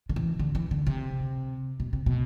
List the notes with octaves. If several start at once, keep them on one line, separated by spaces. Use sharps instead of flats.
D3
E3
D3
E3
D3
C3
B2
C3
B2